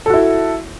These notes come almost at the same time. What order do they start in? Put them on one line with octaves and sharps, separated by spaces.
A4 F#4 E4